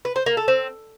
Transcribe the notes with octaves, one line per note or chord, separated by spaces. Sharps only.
B4
C5
A#3
A4
C4